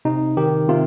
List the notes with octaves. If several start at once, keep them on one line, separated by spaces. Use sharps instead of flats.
C3 D#4
D#3 G4
C3 F4